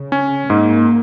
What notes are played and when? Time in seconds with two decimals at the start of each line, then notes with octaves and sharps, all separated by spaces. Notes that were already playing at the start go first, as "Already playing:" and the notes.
Already playing: C#3
0.12 C#4
0.49 G#2 A#3